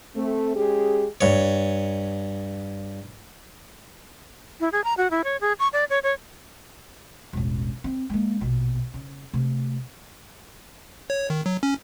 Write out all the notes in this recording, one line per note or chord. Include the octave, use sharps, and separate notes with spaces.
A3 C4
G#3 C#4 G4 G#4
G2 C#5
E4
G#4
A#5
F#4
E4
C#5
G#4
C#6
D5
C#5
C#5
E1 A1
C4
G#3 A#3
A#1 B2
C#3
C3 A3
C#5
D#3
F#3
C#4